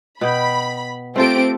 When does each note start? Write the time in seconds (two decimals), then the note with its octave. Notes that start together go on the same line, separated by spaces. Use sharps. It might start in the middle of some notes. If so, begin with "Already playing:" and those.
0.21 B2 G5 B5
1.16 A3 C4 F4 G4 A4 D7